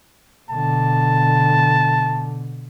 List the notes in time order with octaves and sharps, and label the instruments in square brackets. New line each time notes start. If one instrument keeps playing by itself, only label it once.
[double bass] B2 D3 [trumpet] A5